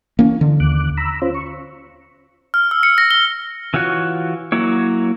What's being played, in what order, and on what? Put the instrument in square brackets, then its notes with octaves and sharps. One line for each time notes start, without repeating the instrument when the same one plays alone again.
[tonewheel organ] E3 [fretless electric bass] A#3 C#4
[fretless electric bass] D3
[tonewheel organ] D#2 D6 F#6
A#5 B5 E6
C#4 F4 C5
C#6
[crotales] F6
E6
C#7
A#6
G7
[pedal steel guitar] E3 F4 F#4 C#5 F#6
F#3 A#3 E4 C#5